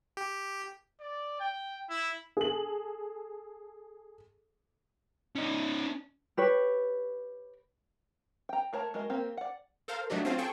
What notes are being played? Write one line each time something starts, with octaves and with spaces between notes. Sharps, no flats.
G4
D5
G5
E4
G#4 A4 F#7
C#4 D#4
G4 B4 C#5
G5 A#5
A3 A#4 C#5 A5
G#3 F#4 A#4 D#5
A#3 C4 G4 A#4
D5 F#5
A4 A#4 C5 F5
F#3 A3 D4 D#4 F#4 G4
C4 C#4 F4 C5
G#4 A4 G5 G#5 C#6